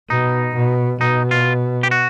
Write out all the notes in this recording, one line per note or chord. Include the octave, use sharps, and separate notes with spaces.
B2 D#4
B2
B2 D#4
F4
G4
F#4